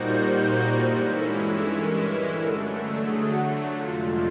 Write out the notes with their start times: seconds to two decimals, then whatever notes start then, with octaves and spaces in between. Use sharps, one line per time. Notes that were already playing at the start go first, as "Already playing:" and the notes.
Already playing: A#2 G3 A#3 D#4 F#4 C5
0.81 G2 E3 G#3 C#4 E4 C5
1.14 A#4
1.18 A4
1.56 A4
1.81 A#4
2.06 B4
2.31 D3 F#3 A3 A4
2.40 A#4
2.50 A4
3.07 G#4
3.32 F#4
3.57 F#4
3.82 F2 C3 F3 G#3 F4